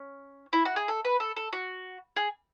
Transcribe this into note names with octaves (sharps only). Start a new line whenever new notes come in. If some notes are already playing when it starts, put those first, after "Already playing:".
Already playing: C#4
E4
F#4
G#4
A4
B4
A4
A4
F#4
G#4